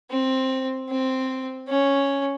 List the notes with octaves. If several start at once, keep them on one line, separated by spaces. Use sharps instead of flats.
C4
C4
C#4